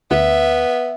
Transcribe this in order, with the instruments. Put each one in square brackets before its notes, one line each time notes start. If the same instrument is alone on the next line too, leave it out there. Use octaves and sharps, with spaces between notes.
[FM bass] D2 [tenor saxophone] B3 [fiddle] E5